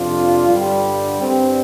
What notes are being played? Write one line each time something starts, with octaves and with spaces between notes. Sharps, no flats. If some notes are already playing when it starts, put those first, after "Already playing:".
Already playing: F2 C3 F3 D4 F4
G2 D3 G3
G2 G3 C4